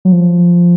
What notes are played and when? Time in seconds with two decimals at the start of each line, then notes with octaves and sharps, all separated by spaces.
0.05 F#3
0.12 F3